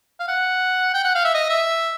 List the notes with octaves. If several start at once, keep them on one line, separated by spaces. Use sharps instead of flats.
F5
F#5
G5
F#5
F5
E5
D#5
E5